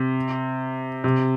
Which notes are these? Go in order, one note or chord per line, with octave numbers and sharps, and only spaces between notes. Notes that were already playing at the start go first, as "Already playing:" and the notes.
Already playing: C3
C3